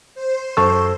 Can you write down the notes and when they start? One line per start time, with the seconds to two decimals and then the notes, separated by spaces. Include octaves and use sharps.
0.14 C5
0.57 F#2 A4 C#6 E6